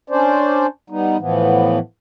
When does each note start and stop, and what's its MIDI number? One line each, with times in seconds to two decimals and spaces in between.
0.10 0.66 61
0.10 0.66 62
0.10 0.66 72
0.10 0.66 74
0.90 1.17 55
0.90 1.17 59
0.90 1.17 63
1.19 1.79 45
1.19 1.79 52
1.19 1.79 53
1.19 1.79 59